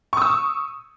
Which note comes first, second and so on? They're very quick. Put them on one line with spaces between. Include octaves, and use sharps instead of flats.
C#6 D#6 E6